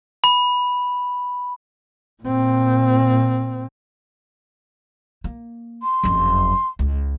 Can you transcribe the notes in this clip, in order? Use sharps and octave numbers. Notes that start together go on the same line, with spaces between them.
B5
A#2 C4
A#3
C6
F#1 F2
C#2